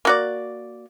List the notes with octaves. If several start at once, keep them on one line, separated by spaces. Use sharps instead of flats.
A#3 F#4 D5